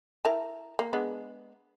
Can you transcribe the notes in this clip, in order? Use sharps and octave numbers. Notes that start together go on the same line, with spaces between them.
E4 A#4 A5
A#3
G#3 B3 D4